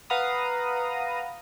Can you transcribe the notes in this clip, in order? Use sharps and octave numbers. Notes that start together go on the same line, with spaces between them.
B4 F5 F#5 A#5 B5 D#6